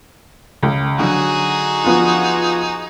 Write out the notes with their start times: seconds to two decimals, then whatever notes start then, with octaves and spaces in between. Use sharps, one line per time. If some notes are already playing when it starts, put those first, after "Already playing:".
0.63 C#2
0.99 D3 F#3 D#4 F#4 G#4
1.85 F3 B3 F4